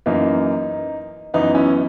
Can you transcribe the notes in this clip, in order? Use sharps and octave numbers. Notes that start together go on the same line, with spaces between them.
F#2 E3 A#3 D#4
F#2 E3 B3 D#4
C#4 E4